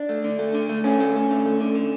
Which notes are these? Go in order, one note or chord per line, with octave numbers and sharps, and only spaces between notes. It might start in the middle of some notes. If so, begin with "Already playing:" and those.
Already playing: D4
A3
D3
A3
D3
A3
D3 C#4
A3
A3
D3
A3
D3
D3